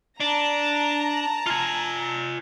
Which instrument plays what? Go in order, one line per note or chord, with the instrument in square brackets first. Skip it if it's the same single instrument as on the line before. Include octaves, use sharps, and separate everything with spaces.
[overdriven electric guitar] D4 [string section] A5 A#5
[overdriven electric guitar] F4 G#5